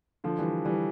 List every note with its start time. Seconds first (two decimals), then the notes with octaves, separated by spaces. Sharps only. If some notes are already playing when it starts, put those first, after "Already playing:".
0.24 D3 F3
0.39 E3 G3
0.65 E3 G3